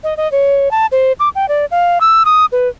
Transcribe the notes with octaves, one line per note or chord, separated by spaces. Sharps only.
D#5
D#5
C#5
A5
C5
D6
G5
D5
F5
E6
D#6
B4